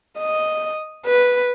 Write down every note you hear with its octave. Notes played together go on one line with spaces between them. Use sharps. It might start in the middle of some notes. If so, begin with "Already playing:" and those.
D#5
B4